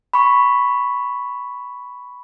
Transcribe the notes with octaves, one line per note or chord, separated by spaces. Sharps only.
B5 C#6